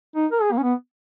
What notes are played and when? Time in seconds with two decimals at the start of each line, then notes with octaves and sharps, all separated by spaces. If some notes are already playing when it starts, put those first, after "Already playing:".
0.15 D#4
0.31 A#4
0.42 G#4
0.52 A#3
0.58 C#4
0.63 B3